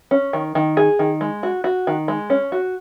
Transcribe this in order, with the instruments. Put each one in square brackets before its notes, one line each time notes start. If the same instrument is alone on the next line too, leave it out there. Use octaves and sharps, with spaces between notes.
[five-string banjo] C#4
D#3
D#3
G#4
D#3
G#3
F#4
F#4
D#3
G#3
C#4
F#4